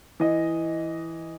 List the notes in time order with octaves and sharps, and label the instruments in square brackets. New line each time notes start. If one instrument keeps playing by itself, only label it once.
[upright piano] E3 D#5